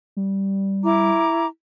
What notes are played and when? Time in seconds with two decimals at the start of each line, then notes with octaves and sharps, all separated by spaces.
0.17 G3
0.83 E4 A#5 D6